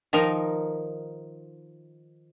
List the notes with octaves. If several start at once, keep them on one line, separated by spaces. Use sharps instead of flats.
D#3 F3 D#4 A#4